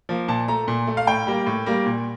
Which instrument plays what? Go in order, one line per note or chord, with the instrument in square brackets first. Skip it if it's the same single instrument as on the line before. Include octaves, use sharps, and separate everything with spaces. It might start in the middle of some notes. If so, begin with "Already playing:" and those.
[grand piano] F3 A#3
A#2 A5
A3 A#5
A#2
A3
F5
A2 G5
G3 A#3
A2
G3 A#3
A#2